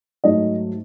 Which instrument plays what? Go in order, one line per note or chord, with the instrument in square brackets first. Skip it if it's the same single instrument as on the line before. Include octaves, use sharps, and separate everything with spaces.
[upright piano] G#2 F#3 A3 D#5